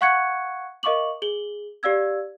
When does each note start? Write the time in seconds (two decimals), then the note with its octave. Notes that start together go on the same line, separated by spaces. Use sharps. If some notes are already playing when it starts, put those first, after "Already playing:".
0.01 F5 F#5 C#6 F#6 G#6 C#7
0.83 A#4 D#5 F5 C#6 D6 F#7
1.22 G#4 F#7 G7
1.83 G4 D5 F5 E6 G#6